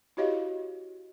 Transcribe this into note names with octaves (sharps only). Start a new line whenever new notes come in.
E4 F#4 G4 C#5 D#5 F5